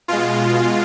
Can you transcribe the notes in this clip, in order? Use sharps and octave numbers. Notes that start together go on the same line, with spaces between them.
B2 G#3 F4